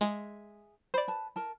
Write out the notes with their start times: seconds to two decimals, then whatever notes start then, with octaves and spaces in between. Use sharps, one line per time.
0.01 G#3 G#4 E5
0.94 C5 D5 B5
1.08 B4 A5
1.36 A#4 A5